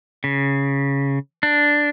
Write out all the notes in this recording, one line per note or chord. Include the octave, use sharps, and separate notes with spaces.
C#3
D4